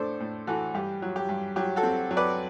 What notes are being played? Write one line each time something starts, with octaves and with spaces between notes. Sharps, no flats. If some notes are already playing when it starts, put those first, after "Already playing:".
Already playing: A2 D4 A4 C5
A2
E3 F#4 A4
G2 G4
F#3
G4
G2
F#3 G4
F#4 A4
C4
F#3
B4 D5